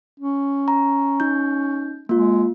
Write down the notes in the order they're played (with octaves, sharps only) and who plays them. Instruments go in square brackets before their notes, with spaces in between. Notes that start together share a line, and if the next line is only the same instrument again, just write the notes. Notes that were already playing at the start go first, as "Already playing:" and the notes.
[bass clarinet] C#4
[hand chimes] A#5
D#4 G6
[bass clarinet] G#3 [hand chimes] A#3 F4